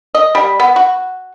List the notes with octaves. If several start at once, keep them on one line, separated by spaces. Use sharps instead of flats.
D#5
G3
B3
F#4